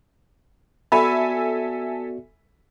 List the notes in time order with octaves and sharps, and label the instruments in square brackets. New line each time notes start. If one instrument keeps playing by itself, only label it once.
[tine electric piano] B3 F#4 D5 [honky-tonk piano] A4 E5 G#5 [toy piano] B5